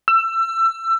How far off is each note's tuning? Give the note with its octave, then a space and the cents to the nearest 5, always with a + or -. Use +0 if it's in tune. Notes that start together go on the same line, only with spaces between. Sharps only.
E6 +25